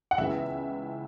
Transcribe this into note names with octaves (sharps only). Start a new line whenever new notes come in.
F#5
C#2 C#3 E3 B3 E5